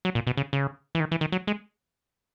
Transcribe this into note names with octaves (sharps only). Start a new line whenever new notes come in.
F#3
A#2
B2
C#3
C#3
E3
D#3
E3
D#3
F#3
G#3